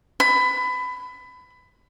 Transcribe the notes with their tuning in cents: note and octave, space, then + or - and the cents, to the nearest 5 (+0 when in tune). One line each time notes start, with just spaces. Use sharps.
B5 +20